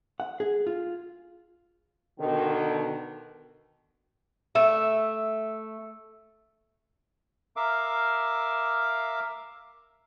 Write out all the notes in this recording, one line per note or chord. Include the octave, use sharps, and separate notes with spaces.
F#5
G#4
F4
B2 D3 D#3
A3 E5
A#4 E5 F5 D6